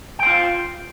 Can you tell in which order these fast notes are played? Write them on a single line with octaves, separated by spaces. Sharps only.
G5 C5 F4